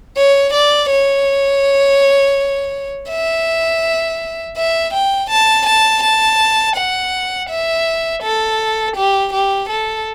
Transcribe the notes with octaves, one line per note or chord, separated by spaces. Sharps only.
C#5
D5
C#5
E5
E5
G5
A5
A5
A5
F#5
E5
A4
G4
G4
A4